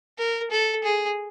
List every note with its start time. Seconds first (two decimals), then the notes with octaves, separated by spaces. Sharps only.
0.18 A#4
0.51 A4
0.84 G#4